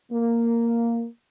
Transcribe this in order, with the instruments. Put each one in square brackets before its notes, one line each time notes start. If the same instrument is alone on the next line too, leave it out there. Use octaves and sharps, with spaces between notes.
[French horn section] A#3